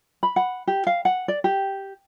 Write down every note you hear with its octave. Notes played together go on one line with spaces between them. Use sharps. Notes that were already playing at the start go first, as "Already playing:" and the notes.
B5
F#5
G4
F5
F#5
D5
G4